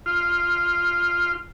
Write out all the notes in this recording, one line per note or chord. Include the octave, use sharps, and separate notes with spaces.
F4